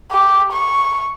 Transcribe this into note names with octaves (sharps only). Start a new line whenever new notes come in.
G4
C#6